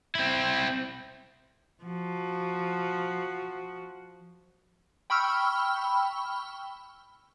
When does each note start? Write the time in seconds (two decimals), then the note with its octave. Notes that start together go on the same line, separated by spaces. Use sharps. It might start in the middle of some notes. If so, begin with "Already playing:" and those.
0.15 C4 E4
1.85 F3 F#4
5.10 G5 B5 C#6 E6 F6